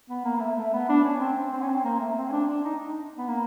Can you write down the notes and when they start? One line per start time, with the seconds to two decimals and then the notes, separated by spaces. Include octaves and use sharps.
0.09 B3
0.25 A#3
0.37 A#3
0.41 A3
0.57 A3
0.73 B3
0.89 D4
1.04 C#4
1.21 C4
1.53 C4
1.62 C#4
1.69 C4
1.84 A#3
2.00 A3
2.17 C4
2.29 C#4
2.32 D4
2.48 D4
2.65 D#4
3.18 B3
3.28 A#3